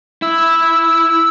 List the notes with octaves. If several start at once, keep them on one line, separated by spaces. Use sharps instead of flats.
E4 E6